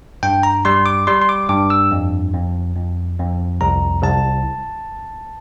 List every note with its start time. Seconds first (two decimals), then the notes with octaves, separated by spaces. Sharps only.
0.23 G2 G5
0.43 A#5
0.65 G3 C6
0.86 D6
1.07 G3 C6
1.22 C6
1.29 D6
1.49 G2 D6
1.70 E6
1.91 F2
2.34 F2
2.76 F2
3.19 F2
3.61 C2 A#5
4.03 C2 A5